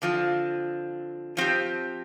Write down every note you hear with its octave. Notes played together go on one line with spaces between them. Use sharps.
D3 F3 C4 F4
F3 C4 G4